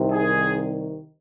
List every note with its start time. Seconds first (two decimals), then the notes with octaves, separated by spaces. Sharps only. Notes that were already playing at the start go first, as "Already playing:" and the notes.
Already playing: C2 C3 D#3
0.11 G#4